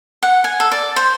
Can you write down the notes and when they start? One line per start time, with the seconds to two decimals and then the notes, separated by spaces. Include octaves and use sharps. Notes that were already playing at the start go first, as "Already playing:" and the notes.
0.23 F#5
0.44 G#5
0.60 A4
0.72 D5
0.96 C5